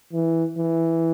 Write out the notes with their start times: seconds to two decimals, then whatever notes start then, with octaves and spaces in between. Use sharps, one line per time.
0.13 E3
0.59 E3